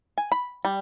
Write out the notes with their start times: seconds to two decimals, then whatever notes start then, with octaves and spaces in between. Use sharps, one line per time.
0.18 G#5
0.32 B5
0.65 G3